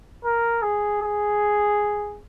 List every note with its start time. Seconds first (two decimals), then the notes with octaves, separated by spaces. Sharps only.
0.25 A#4
0.62 G#4
1.02 G#4